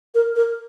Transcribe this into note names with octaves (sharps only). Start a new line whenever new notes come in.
A#4
A#4